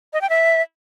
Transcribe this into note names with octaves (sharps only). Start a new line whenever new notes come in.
D#5
G5
E5